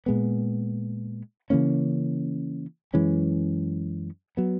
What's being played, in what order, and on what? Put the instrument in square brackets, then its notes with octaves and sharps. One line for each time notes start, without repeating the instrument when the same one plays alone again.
[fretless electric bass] A#2 G#3 B3
C#3 E3 A#3 C#4
F#2 E3 G#3 C#4
F#3 B3